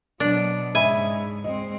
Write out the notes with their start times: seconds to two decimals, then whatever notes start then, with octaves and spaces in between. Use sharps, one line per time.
0.20 B2 F#3 D4
0.75 G#2 C#3 D#5 E5 G#5 B5
1.44 G#3 C4 D#5